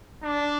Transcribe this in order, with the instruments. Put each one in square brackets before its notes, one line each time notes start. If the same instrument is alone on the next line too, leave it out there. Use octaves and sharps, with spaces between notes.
[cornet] D4